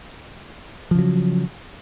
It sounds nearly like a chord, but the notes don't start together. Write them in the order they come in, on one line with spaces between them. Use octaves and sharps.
F3 C#3 F#3